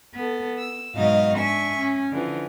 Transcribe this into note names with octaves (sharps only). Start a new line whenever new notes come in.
B3 A4
E6
G#2 B2 F#3 D#4 F5
D4 E5 G#5 C#6
C#4
D3 E3 F3